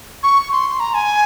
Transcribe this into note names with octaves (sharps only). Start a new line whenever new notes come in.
C#6
C6
A#5
G#5